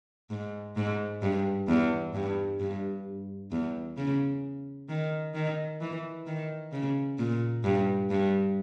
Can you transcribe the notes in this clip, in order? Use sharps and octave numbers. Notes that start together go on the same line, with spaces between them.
G#2
G#2
G2
E2
G2
G2
E2
C#3
D#3
D#3
E3
D#3
C#3
A#2
G2
G2